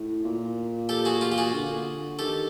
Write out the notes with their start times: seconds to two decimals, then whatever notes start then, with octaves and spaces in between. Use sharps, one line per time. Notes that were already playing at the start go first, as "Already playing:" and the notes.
Already playing: A2
0.24 A#2
0.89 G4 A4
1.05 F#4 G#4
1.21 F4 G4
1.32 G4
1.38 F#4 G#4
1.54 D3
2.19 D#3 G4 A4